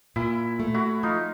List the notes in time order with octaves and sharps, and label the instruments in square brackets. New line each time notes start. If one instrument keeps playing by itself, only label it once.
[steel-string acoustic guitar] A#2 [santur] E4
[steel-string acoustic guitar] A3
[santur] E4 F#4
[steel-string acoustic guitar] F3 [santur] D#4 F4